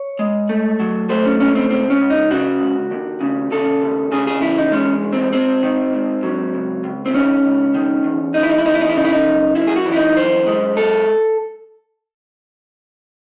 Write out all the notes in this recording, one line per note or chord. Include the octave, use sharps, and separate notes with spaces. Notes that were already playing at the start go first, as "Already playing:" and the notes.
Already playing: C#5
G#3
A3
F#3
A3 C5
C#4
C#2 C#4
C4
C#2 C4
C#4
C#2
D#4
C#3 F#4
C#2
D#2
C#3
C#3 A4
D#2
C#3 G#4
G#4
E2 E4
D#4
G#3 C#4
E2
C4
G#2 C4
D#3
G#2
F#3
C#2
C#2
C4
D#3 C#4
C#2
D#3
E2
E2 D#4
E4
D#4
E4
E2 D#4
E4
D#4
E4
C#3 D#4
E4
D#4
F#2
F#2 E4
G#4
F#4
E3
E4
D#4
F#2 C5
G#3
F#2 A4